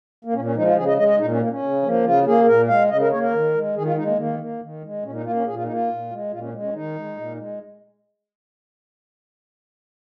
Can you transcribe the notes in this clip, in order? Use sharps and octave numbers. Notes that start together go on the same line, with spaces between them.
A#3
A#2 C#4
C#4
F3 G#3 D#4
F4
C#3 G#4
D#5
G#3 D#5
D#5
A#2 D#4
C#4
A#3
C#4
C#3
F3 A#3
C#3 F4
A#3 G#4
A#2 A#4
G#3 F5
C#3 D#5
A#4
A#3 C#5
A#4
D#3
G#3
D#3 G#4
F4
G#3 D#4
A#3
D#3 A#3
A#3
D#3
G#3
A#2 C#4
D#4
A#3 F4
C#4
A#2 G#4
F4
A#3 D#4
F4
A#2
G#3
A#2 F4
C#4
G#3
C#4
D#3 D#4
G#3
A#2
G#3